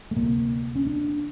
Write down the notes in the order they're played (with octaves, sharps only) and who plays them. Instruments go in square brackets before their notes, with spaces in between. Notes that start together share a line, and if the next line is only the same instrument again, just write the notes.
[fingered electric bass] A3
D2 C3 A#3
C#4
D4